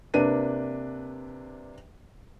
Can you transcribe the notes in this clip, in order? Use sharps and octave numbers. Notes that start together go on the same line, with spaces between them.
C3 A#3 D4 B4 D#7